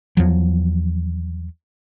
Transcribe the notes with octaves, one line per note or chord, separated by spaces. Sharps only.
E2 F3 F#3